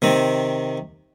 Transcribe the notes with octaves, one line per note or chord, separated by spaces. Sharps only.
C3 D#3 C4